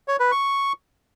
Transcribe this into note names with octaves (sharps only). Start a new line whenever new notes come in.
C#5
B4
C#6